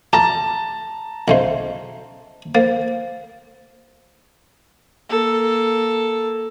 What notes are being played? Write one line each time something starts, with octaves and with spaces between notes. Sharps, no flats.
G4 A5 A#5
B1 C#3 C5 D#5 E5
A#3 C5
A#3 A4